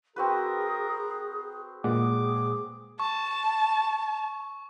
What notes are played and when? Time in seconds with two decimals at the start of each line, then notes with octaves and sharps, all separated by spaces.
0.16 C4 F#4 G#4 A#4 B4
1.84 A#2 G#3 G#4 F#5 D6
3.00 A5 C#6